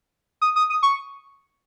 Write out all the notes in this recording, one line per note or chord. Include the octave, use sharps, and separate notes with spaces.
D#6
D#6
D#6
C#6